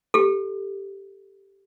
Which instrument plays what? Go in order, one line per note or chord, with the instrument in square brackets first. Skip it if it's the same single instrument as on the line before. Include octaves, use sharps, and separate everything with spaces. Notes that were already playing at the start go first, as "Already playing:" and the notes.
[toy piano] G4 A4